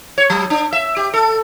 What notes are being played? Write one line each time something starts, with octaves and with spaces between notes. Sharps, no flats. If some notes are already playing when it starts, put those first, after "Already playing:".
C#5
F#3
D4
E5
G4
A4